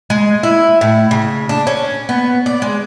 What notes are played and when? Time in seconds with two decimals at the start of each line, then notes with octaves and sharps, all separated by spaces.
0.10 G#3
0.43 E4
0.81 A2
1.11 C#3
1.49 D4
1.67 C#4
2.09 B3
2.46 D5
2.62 G#3